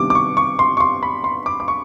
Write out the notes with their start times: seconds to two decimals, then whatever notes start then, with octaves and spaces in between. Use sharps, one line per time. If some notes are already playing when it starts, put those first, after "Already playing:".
Already playing: C3 D#3 G3 B3 D4 D6
0.10 D6
0.15 C#6
0.37 C#6
0.59 C6
0.77 C#6
0.80 C6
1.03 B5
1.24 C6
1.46 D6
1.60 D6
1.68 C#6